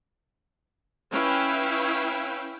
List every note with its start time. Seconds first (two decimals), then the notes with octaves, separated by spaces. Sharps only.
1.11 C#4 E4 B4 F5 G5